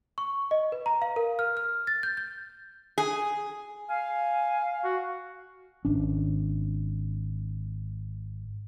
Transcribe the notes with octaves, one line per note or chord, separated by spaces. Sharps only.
C#6
D#5
B4
A#5
F5
A#4
F6
F6
A6
G6
G6
G#4
F5 G#5
F#4
G#1 C#4 D4